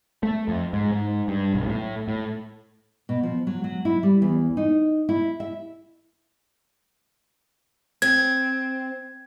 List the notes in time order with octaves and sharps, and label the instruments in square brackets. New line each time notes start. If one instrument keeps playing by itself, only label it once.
[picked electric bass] A3
F2
G#2
G#2
G2
B1
A2
A2
[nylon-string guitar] B2
F3
F#3
F#3
E4
G3
E2
D#4
E4
E5
[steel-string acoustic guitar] C4 [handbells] G#6